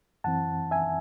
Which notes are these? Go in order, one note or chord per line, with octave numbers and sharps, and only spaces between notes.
F#2 E3 C4 F#5 A5
E5 G#5